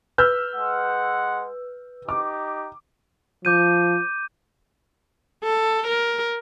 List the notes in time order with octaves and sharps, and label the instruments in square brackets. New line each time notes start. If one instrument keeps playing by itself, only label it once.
[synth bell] B4 [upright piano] E6 F6 G6
[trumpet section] G#3 F#5
[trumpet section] D#4 G4 [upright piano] D6
[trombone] F3 [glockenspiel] D6 G6 D#7
[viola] A4
A#4